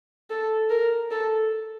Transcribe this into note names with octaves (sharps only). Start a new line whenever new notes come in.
A4
A#4
A4